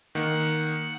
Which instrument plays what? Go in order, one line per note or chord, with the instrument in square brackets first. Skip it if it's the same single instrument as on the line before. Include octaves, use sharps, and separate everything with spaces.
[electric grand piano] D#3 A#3 [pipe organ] F#5